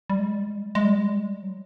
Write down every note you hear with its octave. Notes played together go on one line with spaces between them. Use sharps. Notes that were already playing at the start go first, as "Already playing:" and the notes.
G3
G#3
G3
G#3
G3
G#3
G3
G#3
G3
G#3
G3
G#3
G3
F#3